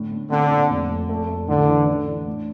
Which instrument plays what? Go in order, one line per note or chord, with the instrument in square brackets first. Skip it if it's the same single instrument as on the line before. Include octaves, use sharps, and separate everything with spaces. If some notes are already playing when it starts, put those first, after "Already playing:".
Already playing: [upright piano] A2 D3
A2
[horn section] D3 [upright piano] C4
[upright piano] A#2
F1
F1
A3
A3
[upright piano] A1 [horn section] D3
[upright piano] E3
D4
D4
A2